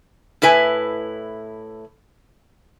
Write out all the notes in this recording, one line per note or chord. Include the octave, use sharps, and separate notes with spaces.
A2 E4 B4 G#5